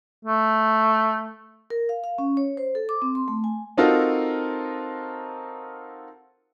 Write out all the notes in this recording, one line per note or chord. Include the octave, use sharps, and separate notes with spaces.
A3
A#4
F5
F5
C#4
C#5
C5
A4
D6
C4
C6
A3
G#5
C4 D#4 F4 F#4 A4 A#4